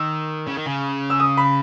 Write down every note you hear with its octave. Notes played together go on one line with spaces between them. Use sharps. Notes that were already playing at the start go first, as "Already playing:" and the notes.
Already playing: D#3 E6
C#3
D#3
C#3
E6
D#6
B5